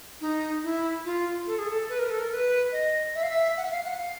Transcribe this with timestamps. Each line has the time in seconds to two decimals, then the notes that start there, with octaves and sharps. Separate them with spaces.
0.21 D#4
0.64 E4
1.05 F4
1.47 A4
1.59 G#4
1.70 A4
1.89 B4
1.99 A#4
2.10 A4
2.19 A#4
2.31 B4
2.72 D#5
3.15 E5
3.23 F5
3.30 E5
3.57 F#5
3.65 E5
3.71 F5
3.85 F#5
3.98 F5